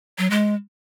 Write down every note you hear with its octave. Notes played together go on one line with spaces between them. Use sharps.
F#3
G#3